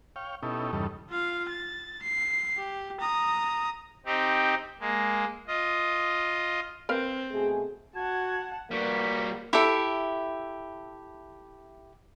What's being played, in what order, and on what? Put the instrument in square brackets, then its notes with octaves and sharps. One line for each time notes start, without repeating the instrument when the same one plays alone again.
[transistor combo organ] C#5 F5 G5
B2 C#4 D#4 E4 G4 A4
E2 G2 C#3 G3 D#4 A4
[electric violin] F4 F5
A6
C7
G4
A#5 D#6
[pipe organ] C4 D#4 G4
G#3 A#3
F4 D#5
[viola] C4 [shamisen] A#4 B4 F5
[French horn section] B2 A3 G#4
[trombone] F#4 [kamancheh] F#5 A5 [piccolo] G#6
[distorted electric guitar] G3 F#4 [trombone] A#3 [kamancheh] B4 [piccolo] B6
[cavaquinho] E4 G4 A4 E5